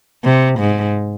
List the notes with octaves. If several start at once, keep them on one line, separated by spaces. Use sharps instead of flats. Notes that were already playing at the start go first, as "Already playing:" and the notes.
C3
G#2